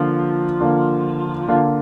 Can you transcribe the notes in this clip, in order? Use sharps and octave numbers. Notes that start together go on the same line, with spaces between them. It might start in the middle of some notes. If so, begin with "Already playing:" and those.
Already playing: D3 F3 A#3 F4
D3 A#3 F4
D3 A#3 F4